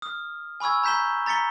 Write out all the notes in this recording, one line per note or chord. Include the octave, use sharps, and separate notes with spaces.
D#6 F6
G#5 B5 C#6 E6 G#6
A#5 G6 B6 E7 G7
A#5 A6 B6 C#7 G7